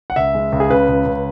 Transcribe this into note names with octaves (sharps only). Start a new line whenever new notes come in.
F#5
C#2 E5
G#3
C#2
G#4
C#3 B4
C#2
C#2